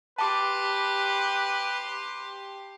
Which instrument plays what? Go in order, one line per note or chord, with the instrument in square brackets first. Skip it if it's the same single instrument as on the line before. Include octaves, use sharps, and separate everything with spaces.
[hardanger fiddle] G4 C6 [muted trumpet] B4 [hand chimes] A5 D6